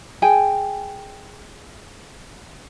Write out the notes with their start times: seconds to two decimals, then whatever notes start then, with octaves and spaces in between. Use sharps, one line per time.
0.22 G#4 G5 G#5